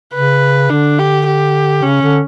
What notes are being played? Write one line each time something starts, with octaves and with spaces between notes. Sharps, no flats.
C#3 B4
D3 D4
G4
G4
C#3 C#4
D3